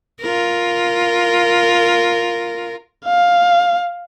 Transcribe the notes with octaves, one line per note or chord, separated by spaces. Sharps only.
F4 A#4
F5